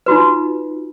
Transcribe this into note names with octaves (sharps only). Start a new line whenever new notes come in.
D#4 F4 F#4 B4